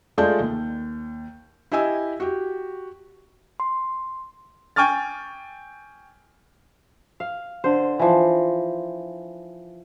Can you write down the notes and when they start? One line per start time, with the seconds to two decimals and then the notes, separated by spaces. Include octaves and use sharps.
0.18 G#3 A3 F4 D5 A5 G6
0.40 D#2
1.72 E4 G4 D#5 G#5 E6
2.20 F#4 G4
3.60 C6
4.76 G5 G#5 C#6 F6 A6
7.20 F5
7.64 D3 C5
7.99 E3 F3